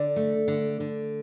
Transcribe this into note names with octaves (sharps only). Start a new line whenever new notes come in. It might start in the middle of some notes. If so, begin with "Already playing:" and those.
Already playing: D3 D5
A3
D3
D3